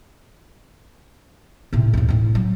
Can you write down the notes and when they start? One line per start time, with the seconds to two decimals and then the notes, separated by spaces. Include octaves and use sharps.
1.73 A2 C3
1.93 D2 A2
2.09 A2 C4
2.35 F#3